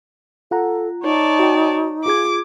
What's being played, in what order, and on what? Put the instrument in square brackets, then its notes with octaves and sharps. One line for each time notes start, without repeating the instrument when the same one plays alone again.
[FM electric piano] F4 F#5 A#5 [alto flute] A4
[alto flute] D#4 [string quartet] C#5 D5 A5
[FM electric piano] F#4 G5
[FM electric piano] F4 G#4 G#6 [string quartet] D6